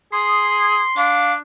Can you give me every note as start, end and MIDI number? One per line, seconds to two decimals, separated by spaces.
0.13 0.78 68
0.13 1.21 84
0.13 0.84 87
0.97 1.37 62
0.97 1.33 77